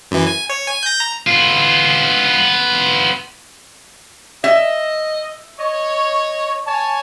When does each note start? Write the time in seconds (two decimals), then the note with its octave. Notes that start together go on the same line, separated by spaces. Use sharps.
0.11 F#2 E3
0.27 G#5
0.50 C#5
0.67 G#5
0.83 G6 A#6
1.00 A#5
1.27 B3 F4
4.44 D#5 E5
5.60 C#5 D#5
6.66 C#5 G#5 A5